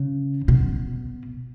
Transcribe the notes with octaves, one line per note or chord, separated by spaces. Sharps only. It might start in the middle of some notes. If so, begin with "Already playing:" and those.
Already playing: C#3
B2